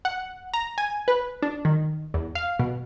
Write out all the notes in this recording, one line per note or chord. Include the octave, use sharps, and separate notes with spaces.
F#5
A#5
G#5
B4
D4
D#3
E2
F5
B2